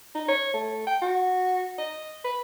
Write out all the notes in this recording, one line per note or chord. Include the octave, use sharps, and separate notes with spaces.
D#4
C#5
A3
G5
F#4
D#5
B4